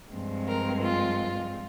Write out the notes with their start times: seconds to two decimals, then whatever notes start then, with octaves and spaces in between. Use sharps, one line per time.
0.12 G2 F3 G#3 C4
0.47 A#4
0.81 F4